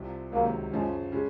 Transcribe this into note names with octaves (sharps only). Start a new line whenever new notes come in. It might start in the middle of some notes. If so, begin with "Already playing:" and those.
Already playing: C2 C3 F3
C#2 C3 D#3 F#3 A#3
F#2 C#3 F3 G#3
C#3 G#3